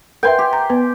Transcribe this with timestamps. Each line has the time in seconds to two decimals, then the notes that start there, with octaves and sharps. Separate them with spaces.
0.23 A#4 B4 E5 G5 G#5 C6
0.39 G4
0.53 A#5
0.70 B3 B4